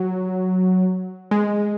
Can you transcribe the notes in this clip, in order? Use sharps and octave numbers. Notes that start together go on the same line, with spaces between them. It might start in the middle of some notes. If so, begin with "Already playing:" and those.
Already playing: F#3
G#3